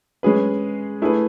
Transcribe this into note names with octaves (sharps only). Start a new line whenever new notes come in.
G#3 C#4 G#4 B4
A3 E4 G#4 B4